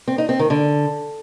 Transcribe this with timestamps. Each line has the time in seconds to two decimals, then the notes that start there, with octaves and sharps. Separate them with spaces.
0.08 C4
0.18 D#4
0.29 C4
0.39 D#3
0.50 D3